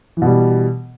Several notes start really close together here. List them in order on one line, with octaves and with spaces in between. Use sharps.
E3 B2 G3